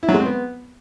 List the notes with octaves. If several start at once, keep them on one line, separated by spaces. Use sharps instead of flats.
E4
F#3
G#3
C4
B3